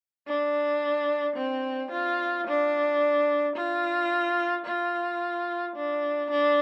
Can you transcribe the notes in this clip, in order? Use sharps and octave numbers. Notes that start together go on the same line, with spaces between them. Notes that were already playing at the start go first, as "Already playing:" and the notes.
D4
C4
F4
D4
F4
F4
D4
D4